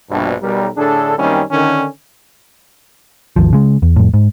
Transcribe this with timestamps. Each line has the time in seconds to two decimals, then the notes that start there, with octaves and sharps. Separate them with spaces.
0.10 A#1 G2 B2
0.42 B1 G3 A#4
0.77 A2 D3 D4 G#4 A4
1.18 F#2 D#3 G3 A#3 C4 C#4
1.51 D3 D#3 C#4
3.36 G#1 D#2 F3
3.53 C#3 G#3
3.82 E2
3.96 F2 A2
4.14 G#2